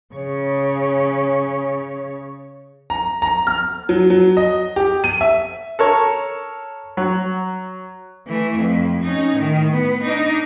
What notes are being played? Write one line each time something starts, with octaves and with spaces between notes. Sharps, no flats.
C#3 C#5
A#5
A#5
F6
F#3
F#3
D#5
G4
D#7
E5
A4 A#4 C#5
F#3
E3 A3
F2
C#4 D#4
A2 D#3
B3
D4 D#4